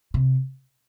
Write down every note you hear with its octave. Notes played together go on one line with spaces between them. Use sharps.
C3